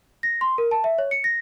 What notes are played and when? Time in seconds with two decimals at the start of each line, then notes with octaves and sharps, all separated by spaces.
0.23 A#6
0.41 C6
0.58 A#4
0.71 A5
0.84 E5
0.98 C#5
1.11 C#7
1.24 A#6